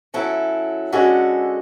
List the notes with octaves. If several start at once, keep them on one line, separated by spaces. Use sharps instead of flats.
F#3 C#4 E4 A4
D3 G#3 C#4 F#4 A4